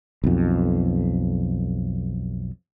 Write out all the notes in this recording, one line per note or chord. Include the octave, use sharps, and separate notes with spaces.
B1 F2